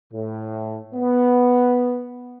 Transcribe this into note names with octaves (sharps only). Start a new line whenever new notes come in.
A2
B3